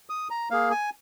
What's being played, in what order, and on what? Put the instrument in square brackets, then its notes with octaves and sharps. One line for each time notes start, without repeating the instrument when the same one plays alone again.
[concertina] D#6
A#5
A#3 G#4 F5
G#5